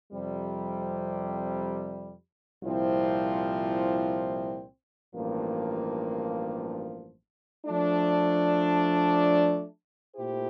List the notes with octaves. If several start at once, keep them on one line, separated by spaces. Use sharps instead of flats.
F2 C3 G3
C2 A#2 F3 C4 E4
A1 G2 F3 A#3
F3 A3 D4
A#2 A3 E4 G4 C5